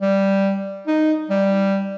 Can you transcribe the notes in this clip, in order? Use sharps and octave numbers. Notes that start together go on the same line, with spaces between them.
G3
D#4
G3